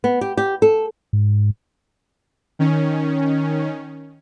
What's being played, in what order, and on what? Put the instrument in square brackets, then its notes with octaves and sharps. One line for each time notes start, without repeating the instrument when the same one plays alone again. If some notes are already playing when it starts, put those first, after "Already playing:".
[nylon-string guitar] B3
G4
G4
A4
[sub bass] G#2
[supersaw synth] D#3 C#4